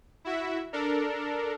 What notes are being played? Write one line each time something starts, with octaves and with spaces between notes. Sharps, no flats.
E4 F#4 E5
D4 A4 A#4